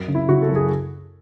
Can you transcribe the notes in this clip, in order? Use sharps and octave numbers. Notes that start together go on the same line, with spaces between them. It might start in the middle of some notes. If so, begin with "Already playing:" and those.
Already playing: F#2
C#3
E4
C#3 F#4
A4
F#2
G#4